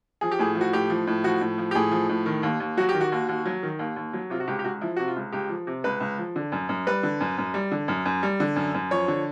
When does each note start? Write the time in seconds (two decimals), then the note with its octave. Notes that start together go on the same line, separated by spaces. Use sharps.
0.21 F3 G#4
0.31 G4
0.39 A2 G#4
0.55 F3
0.61 F#4
0.73 A2 G4
0.90 F3
1.07 A2
1.24 F3 F#4
1.41 A2
1.58 F3
1.71 G4
1.75 A2 G#4
1.91 F3
2.09 A2
2.26 D#3
2.43 D#2
2.60 D#2
2.77 F#3 F#4
2.89 G4
2.94 D#3
3.01 F#4
3.12 D#2
3.28 D#2
3.46 F#3
3.63 D#3
3.79 D#2
3.96 D#2
4.13 F#3
4.30 C3 F4
4.40 F#4
4.48 C#2 G4
4.59 G4
4.64 C#2 F#4
4.81 F3 E4
4.96 C3 F#4
5.08 F4
5.16 C#2
5.32 C#2 G4
5.49 F3
5.67 C3
5.84 C#2 B4
6.00 C#2
6.18 F3
6.36 D3
6.52 F#2
6.69 F#2
6.86 G3 B4
7.03 D3
7.20 F#2
7.38 F#2
7.54 G3
7.71 D3
7.88 F#2
8.05 F#2
8.23 G3
8.40 D3
8.56 F#2
8.74 F#2
8.91 F3 C#5
9.08 D3